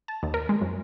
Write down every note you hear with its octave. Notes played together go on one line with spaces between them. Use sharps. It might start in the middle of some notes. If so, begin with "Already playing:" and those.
A5
D#2
A#4
G#3
F#2